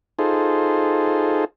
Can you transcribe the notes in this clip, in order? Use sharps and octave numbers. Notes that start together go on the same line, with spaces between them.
D#4 F4 G#4 A4 C5